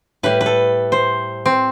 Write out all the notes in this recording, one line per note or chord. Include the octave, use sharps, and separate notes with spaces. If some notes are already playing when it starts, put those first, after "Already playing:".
A2 G3 B4
B4
A4
C5
C4